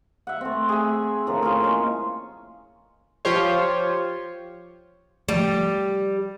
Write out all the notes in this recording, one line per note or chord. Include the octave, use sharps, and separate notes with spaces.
E5 F#5
A3 C4
G#4 E5
A2 D3 F3 A#3
C#4 F4 G#4
G#3 C#5
F3 F4 G4 C5 C#5
F3 G3 A3